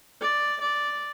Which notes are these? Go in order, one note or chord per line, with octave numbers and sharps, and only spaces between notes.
D5
D5